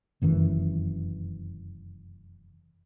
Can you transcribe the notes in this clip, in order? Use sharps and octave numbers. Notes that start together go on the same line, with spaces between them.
F1 F#2 D#3 E3